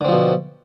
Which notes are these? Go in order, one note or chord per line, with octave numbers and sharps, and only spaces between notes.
B2 D3 F3 C4